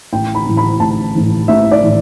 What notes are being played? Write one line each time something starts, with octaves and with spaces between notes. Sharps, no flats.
A1 G5
B5
A2 E3
B5
A1 A5
A2 E3
A1 E5
D5
A2 E3